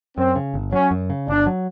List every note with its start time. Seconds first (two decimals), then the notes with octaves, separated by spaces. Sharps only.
0.17 F#2 C4
0.36 C#3
0.54 G1
0.72 F#3 C#4
0.91 F#2
1.10 C#3
1.28 G1 D4
1.47 F#3